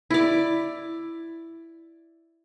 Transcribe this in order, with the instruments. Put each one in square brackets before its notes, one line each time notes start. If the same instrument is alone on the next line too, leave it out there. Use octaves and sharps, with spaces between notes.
[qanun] E4 D5